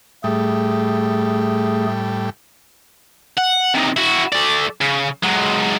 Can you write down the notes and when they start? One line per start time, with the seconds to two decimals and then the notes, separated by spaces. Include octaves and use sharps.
0.24 A2 G3 A3 G#4
3.37 F#5
3.74 C3 D#3
3.97 E4 F#4
4.33 A3 D5
4.81 C#3
5.23 F#3 G#3